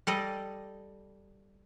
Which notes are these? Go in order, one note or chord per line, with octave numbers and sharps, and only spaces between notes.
G3 A4 D5 D#5